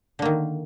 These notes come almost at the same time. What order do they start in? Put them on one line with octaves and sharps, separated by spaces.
D3 A#3 D#3